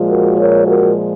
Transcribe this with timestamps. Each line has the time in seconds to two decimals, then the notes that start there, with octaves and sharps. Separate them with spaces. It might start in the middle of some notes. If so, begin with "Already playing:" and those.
Already playing: A#2 F3 G#3
0.08 F#4 A#4
0.37 A#4 C#5
0.66 F#4 A#4